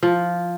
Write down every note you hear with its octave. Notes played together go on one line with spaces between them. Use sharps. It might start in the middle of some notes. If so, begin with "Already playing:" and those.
F3